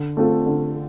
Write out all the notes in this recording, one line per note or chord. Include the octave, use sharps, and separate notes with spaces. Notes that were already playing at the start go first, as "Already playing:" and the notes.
Already playing: D3
A3 C4 F4 A4
D3